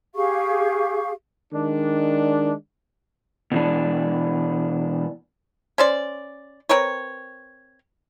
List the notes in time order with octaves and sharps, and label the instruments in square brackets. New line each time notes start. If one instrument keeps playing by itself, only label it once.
[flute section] G4 G#4 F5 C#6
[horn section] D#3 G#3 D4
[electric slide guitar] B2 E3 D4
[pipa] C#4 C5 D5
C4 A#4 B4 C#5